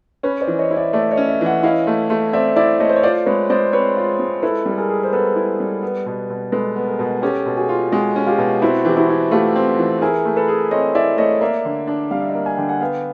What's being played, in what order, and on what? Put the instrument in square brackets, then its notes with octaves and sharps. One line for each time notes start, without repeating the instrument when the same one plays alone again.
[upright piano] C#4 [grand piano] B4 C#5
[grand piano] C5 D5
[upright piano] E3
[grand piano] C#5 D#5
[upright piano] E4
[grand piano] D5 E5
[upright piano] A3 [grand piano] D5 E5
[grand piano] C#5 D#5
[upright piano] C#4
[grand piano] D5 E5
[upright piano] E3
[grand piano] E5 F#5
[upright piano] E4 [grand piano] D#5 F5
[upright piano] A3
A3
[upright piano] C4 [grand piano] D5 E5
[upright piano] E4 [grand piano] D5 E5
[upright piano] A3 [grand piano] C#5 D#5
[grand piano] C5
C#5
[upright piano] F4 [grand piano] C5 D5
[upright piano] G#3 [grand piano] B4 C#5
[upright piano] G#3 [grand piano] C5 D5
[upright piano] C4 [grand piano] B4 C#5
[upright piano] F4
G#3
[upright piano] E4 [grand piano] A4 B4
[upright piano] G3
[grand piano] A4
G#4 A#4
[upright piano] G#4
[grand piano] C5
[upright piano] B3 [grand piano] A4 B4
[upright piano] E4
G3
B3
B2
B2
[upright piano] G#3 [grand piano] A4 B4
[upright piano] B3
[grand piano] G#4 A#4
[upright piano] B2
[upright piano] C#4 [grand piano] G4 A4
[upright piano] B2
[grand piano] F#4 G#4
[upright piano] F4
[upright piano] G#3 [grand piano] F#4 G#4
[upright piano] C#4
[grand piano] F4 G4
[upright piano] B2
[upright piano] C4 [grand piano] E4 F#4
[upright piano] E3 [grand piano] G4
[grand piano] E4 F#4
[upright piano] E4
[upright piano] A3 [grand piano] F4 G4
[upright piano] C4
E3
[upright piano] E4 [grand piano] G#4 A#4
[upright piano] A3
[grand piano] A4 B4
[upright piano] G#4
[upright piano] C4 [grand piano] C#5 D#5
[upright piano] E4 [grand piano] D5 E5
[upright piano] A3 [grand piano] C#5 D#5
[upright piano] A#3 [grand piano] D5 E5
[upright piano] D3
D4
[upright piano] G3 [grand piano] F5
[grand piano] E5
D#5 F5
[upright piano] A#3
[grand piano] G#5
[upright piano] D3 [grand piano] G5
[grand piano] F#5 G#5
[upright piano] B3 [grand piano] F5 G5